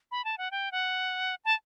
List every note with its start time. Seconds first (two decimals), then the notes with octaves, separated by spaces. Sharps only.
0.11 B5
0.24 A5
0.38 F#5
0.51 G5
0.72 F#5
1.45 A5